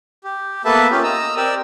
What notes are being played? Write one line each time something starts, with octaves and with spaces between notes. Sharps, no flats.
G4
A#3 B3 A4 B4 E5 A5
C#4 F4 G4
D#5 A#5 E6
C4 G4 A#4 D5 E6